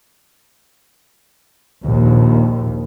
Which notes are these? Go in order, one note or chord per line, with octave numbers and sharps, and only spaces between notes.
A#1 D#2